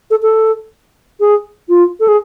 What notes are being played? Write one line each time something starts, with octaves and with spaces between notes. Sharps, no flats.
A4
A4
G#4
F4
A4
G#4